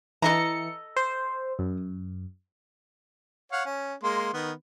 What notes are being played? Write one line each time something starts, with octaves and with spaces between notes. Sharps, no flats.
E3 A4 D#5 A#5 C#7
C5
F#2
C#5 F5 F#5
C#4
G#3 A#3 C6
D#3 B3